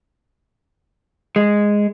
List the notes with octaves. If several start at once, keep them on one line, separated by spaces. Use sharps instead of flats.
G#3